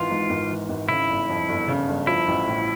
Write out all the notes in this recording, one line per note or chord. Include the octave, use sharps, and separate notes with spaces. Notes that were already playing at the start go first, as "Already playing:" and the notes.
Already playing: G#1 E3 F4
G#2
G#1
E3
G#1
C#3 E4
G1
F2
G1
C#3
G1
F3 E4
A1
A2